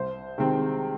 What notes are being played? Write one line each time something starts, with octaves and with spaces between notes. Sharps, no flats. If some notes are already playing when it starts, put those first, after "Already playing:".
Already playing: C2 C5
C3 D#3 G#3 C4